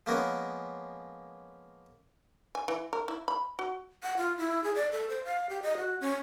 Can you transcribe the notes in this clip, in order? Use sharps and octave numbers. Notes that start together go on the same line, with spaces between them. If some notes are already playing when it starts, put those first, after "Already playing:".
F3 G#3 A#3 B3 C#4 A#4
G#5
E3
A#4
E4
B5
F#4
F#5
F4
E4
G#4
D5
A4
C5
F5
G4
D#5
F#4
C#4